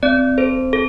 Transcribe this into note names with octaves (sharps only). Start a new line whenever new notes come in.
C4 D5
A4 C5
A4